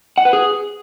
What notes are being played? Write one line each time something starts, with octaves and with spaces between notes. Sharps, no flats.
F#5
B4
G#4